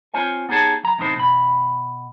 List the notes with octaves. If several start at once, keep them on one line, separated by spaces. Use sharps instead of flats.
C4 F4 C5 C#5 G#5
B3 D#4 G4 G#4 C#5 A5
F#3 A#5
E2 A2 C3 D#4 C5
B2 B5